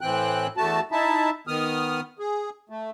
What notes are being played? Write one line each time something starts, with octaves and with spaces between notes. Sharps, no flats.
A2 E3 C4 G5 F#6
E2 A3 F#4 A5
D#4 E4 E5 A5
D#3 B3 D#6 F6
G#4
A3